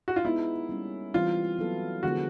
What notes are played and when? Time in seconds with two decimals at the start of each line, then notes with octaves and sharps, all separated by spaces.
0.08 F#4
0.16 F4
0.24 G#3 B3 D#4 E4
0.69 G3 A#3 C#4
1.14 E3 G3 C4 F4
1.59 F#3 B3 E4 A4
2.03 D3 F3 G#3 B3 F#4